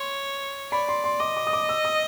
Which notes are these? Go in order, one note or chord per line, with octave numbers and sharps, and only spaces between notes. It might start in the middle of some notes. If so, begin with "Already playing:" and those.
Already playing: C#5 C6
D5 B5
C6
C6
D#5 D6
D6
D#6
D6
E6
D#6